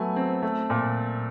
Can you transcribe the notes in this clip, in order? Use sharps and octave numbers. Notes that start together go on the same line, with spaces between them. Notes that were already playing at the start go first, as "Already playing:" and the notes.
Already playing: F#3 A3 B3 G#5
C4
A3
A#2